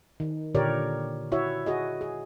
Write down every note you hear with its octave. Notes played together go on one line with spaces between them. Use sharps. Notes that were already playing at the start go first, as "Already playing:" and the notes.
D#3
A#2 D3 G4 A#4 C#5 D5
E4 F#4 C#5 E5
F#4 G#4 D#5
G#4